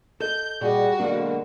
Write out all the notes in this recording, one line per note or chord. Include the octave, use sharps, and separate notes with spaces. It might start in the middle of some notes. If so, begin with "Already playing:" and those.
A4 D#5 G6
A#2 G3 F#4 G#4 D#5
B2 D3 F#3 G#3 A#3 D4 A#4